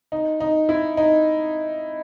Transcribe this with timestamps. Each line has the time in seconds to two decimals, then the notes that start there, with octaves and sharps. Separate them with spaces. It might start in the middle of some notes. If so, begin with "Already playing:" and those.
0.12 D#4
0.40 D#4
0.69 E4
0.97 D#4